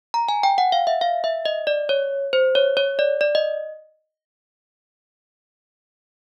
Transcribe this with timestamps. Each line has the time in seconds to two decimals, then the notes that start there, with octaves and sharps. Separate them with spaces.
0.14 A#5
0.29 G#5
0.43 G5
0.58 F#5
0.72 F5
0.87 E5
1.01 F5
1.24 E5
1.45 D#5
1.67 D5
1.89 C#5
2.33 C5
2.55 C#5
2.77 C#5
2.99 D5
3.21 D5
3.35 D#5